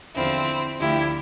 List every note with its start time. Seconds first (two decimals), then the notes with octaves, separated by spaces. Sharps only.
0.14 E2 D3 F3 C4 E4
0.79 D2 D3 F3 E4 G4